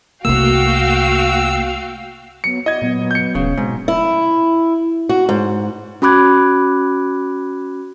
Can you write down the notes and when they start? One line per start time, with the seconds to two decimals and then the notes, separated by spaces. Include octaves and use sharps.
0.25 C2 A3 A#3 C4 F#4 F5 G5 E6
2.44 F#3 B3 C#7
2.66 E4 F#4 D5 D#5 G#6
2.82 A#2 F#3 B3
3.11 G6 C#7
3.35 D#1 C#3
3.57 G#2 B2 C4
3.88 E4
5.09 F#4
5.29 G#2
6.02 C#4 F#4 B5 D6 F#6 G#6